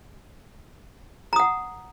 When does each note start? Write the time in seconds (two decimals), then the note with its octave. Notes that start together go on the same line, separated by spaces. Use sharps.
1.33 A#5
1.36 D#6
1.40 F#5